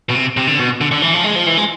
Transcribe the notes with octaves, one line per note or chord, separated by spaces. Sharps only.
B2
C3
C3
D3
B2
D3
D3
E3
F3
G#3
F3
E3
G#3